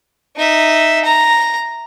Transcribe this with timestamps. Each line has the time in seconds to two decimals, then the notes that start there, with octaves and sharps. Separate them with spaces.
0.37 D#4 E5
1.05 A#5